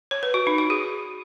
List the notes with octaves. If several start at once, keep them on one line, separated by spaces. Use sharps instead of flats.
C#5
B4
F#4
D#4
F#4
G#4